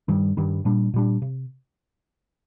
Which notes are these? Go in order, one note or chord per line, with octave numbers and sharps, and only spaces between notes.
G2 D#3 G3
G2 D#3 G3
A#2 G3 D4
A#2 G3 D4
C3